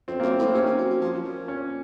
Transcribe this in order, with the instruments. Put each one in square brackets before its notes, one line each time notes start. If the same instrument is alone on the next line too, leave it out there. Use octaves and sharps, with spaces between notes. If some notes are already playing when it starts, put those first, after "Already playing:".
[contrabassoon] F2 [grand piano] C4
[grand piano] A#3
[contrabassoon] F#2
[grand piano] C4
[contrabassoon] A2
[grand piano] C4
[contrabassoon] C3 [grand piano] C#4
[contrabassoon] D#3
F#3
F#3
F3
A#2
[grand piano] C#4